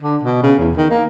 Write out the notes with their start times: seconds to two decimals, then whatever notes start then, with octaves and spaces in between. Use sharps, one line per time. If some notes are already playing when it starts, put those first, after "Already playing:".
0.02 D3
0.23 B2
0.43 C#3
0.59 E2
0.77 D#3
0.91 A#3